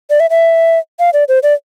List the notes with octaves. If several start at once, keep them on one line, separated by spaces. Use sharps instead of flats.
D5
E5
E5
F5
D5
C5
D5